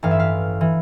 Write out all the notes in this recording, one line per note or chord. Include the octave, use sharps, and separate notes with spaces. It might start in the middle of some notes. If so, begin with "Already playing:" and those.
A1 G2 E3 F5
E5
F5
E3